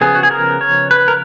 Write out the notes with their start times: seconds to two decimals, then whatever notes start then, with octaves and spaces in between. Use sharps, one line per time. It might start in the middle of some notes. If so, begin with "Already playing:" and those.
0.01 C#3 F3 B3 G#4
0.15 F#4
0.23 G#4
0.31 A#4
0.61 C#5
0.91 B4
1.08 A#4